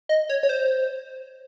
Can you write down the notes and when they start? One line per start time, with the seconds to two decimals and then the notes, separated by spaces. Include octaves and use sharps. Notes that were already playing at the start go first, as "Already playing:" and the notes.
0.09 D#5
0.29 C#5
0.43 C#5
0.49 C5